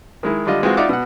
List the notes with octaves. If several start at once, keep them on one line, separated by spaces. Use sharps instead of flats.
D#3 G#3 E4
D3 G3 F4 D#5
E3 G#3 C4 F4 F#4
D#4 F4 D5 E5 F#5 D6
B2 F#5